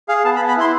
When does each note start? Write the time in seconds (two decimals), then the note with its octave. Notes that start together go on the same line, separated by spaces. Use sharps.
0.08 G#4 F5
0.25 B3 A5
0.36 B5
0.41 B3
0.48 B5
0.57 E4 C6